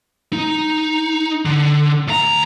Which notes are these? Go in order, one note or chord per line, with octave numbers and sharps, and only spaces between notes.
D#4
D3
D2 A#5